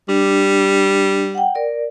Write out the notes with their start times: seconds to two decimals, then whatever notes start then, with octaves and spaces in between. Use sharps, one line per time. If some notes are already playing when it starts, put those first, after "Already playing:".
0.09 G3 D4
1.35 F#5 G5
1.55 A#4 D5